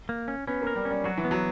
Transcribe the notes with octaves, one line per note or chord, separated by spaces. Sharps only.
A#3
C#4
B3 C#4
A#3
A#4
G3
C#4
G3
F#3 F#4
E3
B3
F#3